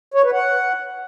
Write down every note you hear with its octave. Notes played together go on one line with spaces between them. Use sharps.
C#5
B4
F#5